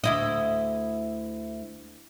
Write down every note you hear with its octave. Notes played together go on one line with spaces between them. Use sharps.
D2 E4 D#5